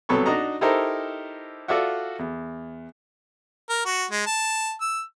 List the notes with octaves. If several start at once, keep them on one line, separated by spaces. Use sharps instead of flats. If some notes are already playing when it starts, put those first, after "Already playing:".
C2 F#3 B3 A4 B5 C#6
D4 D#4 F#4 D#5 A#5
D#4 E4 G4 A4 A#4 C5
F4 F#4 A4 D5 E5 F#5
E2
A#4
F#4
G#3
A5
E6